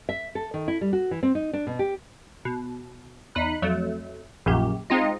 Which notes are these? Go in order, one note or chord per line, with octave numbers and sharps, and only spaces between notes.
E5
A4
D#3
E4
G3
F#4
E3
C4
D#4
D4
B2
G4
B2
E2 D#4 B5 F#6
F2 F#3 A3
A#1 F#2 A#2 G4
G#3 C4 D#4 F4 D#5